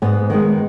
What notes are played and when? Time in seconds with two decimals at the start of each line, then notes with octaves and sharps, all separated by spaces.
0.02 G#2 B3
0.30 D#3 G#3